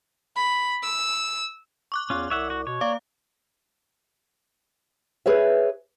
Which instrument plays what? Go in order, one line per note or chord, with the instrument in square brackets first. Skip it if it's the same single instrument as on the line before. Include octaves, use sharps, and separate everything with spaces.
[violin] B5
E6
[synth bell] C#6 D6 F#6
[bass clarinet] E2 [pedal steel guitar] C#4 F4
[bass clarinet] C2 [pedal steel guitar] C#5 E5 F#5
[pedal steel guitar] F#4
[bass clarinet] B2 [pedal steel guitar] C#5
[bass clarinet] A#3 [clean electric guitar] D5 [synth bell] F5
[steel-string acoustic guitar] G#4 B4 C#5 E5